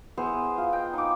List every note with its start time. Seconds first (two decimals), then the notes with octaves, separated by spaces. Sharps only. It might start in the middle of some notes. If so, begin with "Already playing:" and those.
0.18 B3 E4 G#4 C5
0.58 F4
0.72 D#5 G5
0.93 D#4 D6